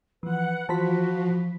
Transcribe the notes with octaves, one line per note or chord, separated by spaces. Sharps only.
E3 F3 B4 F#5
E3 F3 F4 F#4 C5 A5 B5 B6